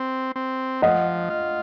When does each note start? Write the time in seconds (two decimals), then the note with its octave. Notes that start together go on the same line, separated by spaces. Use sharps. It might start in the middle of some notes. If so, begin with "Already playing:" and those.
Already playing: C4
0.36 C4
0.82 F3 D#5 F#5
1.30 F4